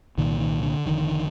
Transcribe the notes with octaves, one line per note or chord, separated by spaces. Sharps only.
C2 A#2 D#3
D#3
D3
F1 F2 D3 D#3